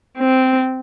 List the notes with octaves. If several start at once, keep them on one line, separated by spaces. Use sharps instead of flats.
C4